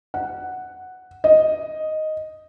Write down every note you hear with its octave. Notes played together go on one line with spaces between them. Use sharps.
F#5
D#5